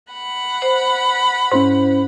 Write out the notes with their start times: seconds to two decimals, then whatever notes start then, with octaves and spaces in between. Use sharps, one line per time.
0.13 F#5 B5
0.62 C5
1.52 G#2 C#4 E4 C5